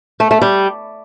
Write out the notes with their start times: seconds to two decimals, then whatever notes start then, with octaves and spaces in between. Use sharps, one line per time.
0.20 A3
0.31 A3
0.42 G3